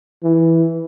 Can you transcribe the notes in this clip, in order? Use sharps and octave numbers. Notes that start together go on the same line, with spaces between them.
E3